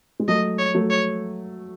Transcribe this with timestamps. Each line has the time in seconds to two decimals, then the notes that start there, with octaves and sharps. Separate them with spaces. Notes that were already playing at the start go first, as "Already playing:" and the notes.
0.20 G#3
0.28 F#3 A3 D#5
0.59 C#5
0.75 F#3 A3
0.90 C#5